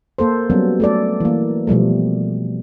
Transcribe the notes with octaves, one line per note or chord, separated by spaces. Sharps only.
A#3 A4 C5
F#3 G3 B3 C#4
A3 A4 D5
E3 A#3
B2 F3 G3 A3